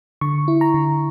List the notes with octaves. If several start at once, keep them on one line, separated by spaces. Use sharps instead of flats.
D3 C#6
E4
A#5
D3